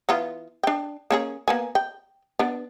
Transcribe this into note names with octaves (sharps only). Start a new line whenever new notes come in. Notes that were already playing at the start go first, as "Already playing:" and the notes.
E3 B3 F4
D4 G5
A#3 C#4 G#4
A#3 B3 G#5
G5
B3 D4